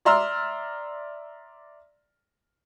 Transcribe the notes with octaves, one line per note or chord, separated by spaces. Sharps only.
D5 E5 A#5 C6 E6 F6